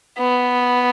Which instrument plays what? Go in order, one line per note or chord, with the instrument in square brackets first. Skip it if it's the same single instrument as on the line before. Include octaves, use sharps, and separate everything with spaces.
[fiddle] B3